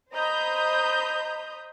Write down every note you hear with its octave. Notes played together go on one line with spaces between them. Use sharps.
C5 D#5 A#5 B5 D#6 G6